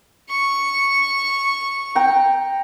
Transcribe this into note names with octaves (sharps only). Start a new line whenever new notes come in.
C#6
G5 A#5